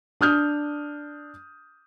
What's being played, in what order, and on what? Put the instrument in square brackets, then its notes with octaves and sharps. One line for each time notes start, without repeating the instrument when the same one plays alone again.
[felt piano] D4 D#6 F6 G6